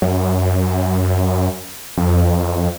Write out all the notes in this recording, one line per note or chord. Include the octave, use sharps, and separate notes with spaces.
F#2
F2